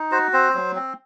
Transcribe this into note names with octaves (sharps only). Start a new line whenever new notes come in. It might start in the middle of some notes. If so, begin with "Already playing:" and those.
Already playing: D#4
F#4 C5
C4 C5
F#3
C4